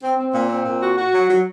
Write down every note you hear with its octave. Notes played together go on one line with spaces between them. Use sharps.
C4
C4
A#2
C4
A#2
F#4
F#4
F#3
F#3